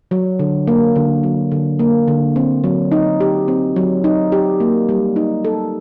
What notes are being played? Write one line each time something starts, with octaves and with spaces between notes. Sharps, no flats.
F#3
D3
A#3
D3
F#3
D3
A#3
D3
C4
F#3
D#4
G4
C4
F#3
D#4
G4
A#3
G3
D#4
A4